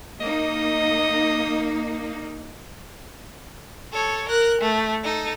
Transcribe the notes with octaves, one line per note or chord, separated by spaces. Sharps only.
A#3 D#4 D#5
A4 C#5
A#4 F#6
A3
D#4 A4